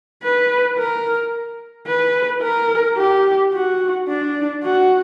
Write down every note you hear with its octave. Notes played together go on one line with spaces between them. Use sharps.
B4
A#4
B4
A#4
G4
F#4
D4
F#4